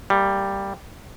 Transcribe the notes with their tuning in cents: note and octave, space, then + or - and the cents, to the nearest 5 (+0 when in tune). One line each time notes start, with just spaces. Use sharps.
G3 +0 A#3 -30